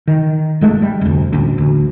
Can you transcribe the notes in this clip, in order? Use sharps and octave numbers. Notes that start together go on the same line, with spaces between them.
D#3
G1 G#3 A3
G3
F1 D2
A1 D2
D2